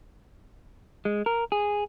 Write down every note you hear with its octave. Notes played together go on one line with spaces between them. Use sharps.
G#3
A#4
G#4